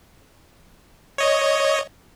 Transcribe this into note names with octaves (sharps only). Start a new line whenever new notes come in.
C#5 D#5